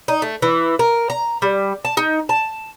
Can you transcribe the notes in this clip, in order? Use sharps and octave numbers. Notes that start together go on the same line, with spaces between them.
D#4
A3
E3
A#4
A#5
G3
A5
D#4
A5